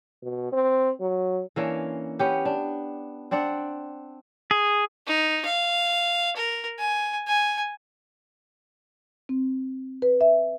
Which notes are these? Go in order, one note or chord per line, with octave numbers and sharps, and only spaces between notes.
B2
C4
F#3
E3 A#3 C#4 D4
B3 C#4 G4
D4
C4 D4 D5 F#5
G#4
D#4
F5
A#4
G#5
G#5
C4
B4
E5